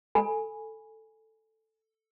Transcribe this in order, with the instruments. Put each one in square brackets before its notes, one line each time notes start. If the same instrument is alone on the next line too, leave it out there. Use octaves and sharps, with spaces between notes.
[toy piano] A4 G#5 B5